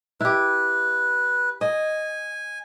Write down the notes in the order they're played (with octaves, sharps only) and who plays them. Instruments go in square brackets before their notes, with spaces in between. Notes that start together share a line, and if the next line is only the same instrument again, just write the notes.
[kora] E4 G4 [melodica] B4
[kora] D#5 [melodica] G#5